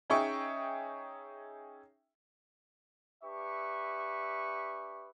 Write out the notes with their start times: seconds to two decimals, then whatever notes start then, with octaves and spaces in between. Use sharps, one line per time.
0.10 C#4 D#4 G#4 E5 G5 C#6
3.24 D4 G4 B4 E5 C#6